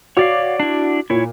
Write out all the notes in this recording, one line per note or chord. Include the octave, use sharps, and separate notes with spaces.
F#4 C#5 D5 F5 D6
D4 E4
A#2 E4 C#5